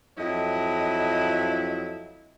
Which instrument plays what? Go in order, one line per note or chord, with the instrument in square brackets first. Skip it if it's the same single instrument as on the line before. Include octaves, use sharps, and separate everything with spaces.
[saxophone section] F2 F#3 E4 [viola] D#5